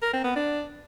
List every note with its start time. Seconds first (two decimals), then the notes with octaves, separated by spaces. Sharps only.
0.02 A#4
0.13 C4
0.25 B3
0.36 D4